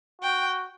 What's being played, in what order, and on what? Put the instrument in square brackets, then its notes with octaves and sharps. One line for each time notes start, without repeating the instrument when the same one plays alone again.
[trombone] F#4 [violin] G5